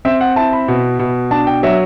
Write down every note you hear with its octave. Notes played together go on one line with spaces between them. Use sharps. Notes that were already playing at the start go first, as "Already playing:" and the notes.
C4 E5
F#5
E4 A5
B5
B2
B2
D4 A5
G5
F#3 E5